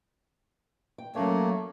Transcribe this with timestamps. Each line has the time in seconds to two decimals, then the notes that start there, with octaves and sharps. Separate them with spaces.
0.98 G5
1.15 F#3 A3 A#3 C#4 C#5